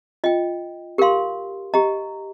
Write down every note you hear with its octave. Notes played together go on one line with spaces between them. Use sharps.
F4 D#5 G5
G4 A#4 F5 C6
G4 D#5 A#5